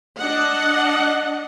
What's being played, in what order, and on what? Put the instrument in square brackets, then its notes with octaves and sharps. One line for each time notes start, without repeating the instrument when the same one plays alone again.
[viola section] D4 D#5 F#5